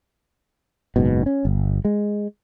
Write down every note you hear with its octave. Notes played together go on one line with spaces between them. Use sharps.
F#1 G#2 B2
C#4
G1
G#3